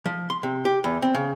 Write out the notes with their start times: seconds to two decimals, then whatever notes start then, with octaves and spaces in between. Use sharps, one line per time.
0.06 F3
0.30 C6
0.43 C3
0.65 G4
0.84 E2
1.02 C4
1.15 C#3